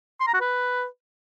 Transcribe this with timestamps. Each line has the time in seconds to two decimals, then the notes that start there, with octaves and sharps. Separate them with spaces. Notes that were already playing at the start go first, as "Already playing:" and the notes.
0.20 C6
0.27 A#5
0.34 F#4
0.41 B4